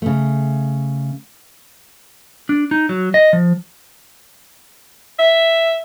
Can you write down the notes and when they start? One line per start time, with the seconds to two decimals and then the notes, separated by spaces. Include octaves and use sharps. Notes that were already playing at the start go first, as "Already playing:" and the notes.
0.02 C#3 A3
2.49 D4
2.71 D#4
2.89 F#3
3.14 D#5
3.33 F3
5.18 E5